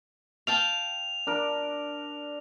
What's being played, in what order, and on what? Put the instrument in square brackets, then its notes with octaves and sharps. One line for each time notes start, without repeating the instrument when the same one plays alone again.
[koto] F5 G5 A5 [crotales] F7
[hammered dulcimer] D4 A#4